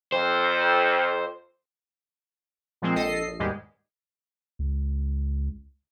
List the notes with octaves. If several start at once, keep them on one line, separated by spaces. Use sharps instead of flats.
F2 C5
A#2 F3 G#3 C4
A#1 A4 D#5 C7
A#1
D#2 G#2 B2 G3 G#3
C#2